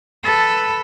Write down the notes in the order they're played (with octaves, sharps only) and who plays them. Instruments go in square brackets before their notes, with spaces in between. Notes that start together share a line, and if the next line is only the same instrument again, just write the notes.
[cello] A4 B4